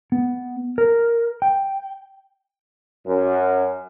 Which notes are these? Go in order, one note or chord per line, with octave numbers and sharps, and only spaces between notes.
B3
A#4
G5
F#2